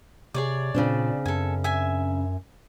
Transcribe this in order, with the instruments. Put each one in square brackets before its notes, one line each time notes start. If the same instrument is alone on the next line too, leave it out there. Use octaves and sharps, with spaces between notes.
[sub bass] C3 [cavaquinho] G#4 C#5 D5
[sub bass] A#2 [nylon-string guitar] C#3 C4 D4
[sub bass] F#2 [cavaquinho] A4 G#5
[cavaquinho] E5 G#5